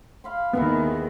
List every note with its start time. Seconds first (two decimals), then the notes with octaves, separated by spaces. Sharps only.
0.24 F5 B5 C6
0.53 D#2 D#3 B3 E4 G#4 A#4